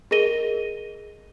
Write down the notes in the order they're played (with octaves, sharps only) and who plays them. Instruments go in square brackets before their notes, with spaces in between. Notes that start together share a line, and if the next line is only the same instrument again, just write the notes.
[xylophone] G#4 A#4 D#5 A#6 D#7 G7